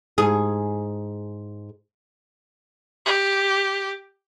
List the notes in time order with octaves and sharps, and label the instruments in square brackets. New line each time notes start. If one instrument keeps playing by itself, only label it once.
[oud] G#2 G#4
[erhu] G4